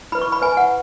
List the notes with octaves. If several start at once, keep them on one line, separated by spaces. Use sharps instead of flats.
E4 B4 B5
C#6
B5
E4 B4 G#5
F#5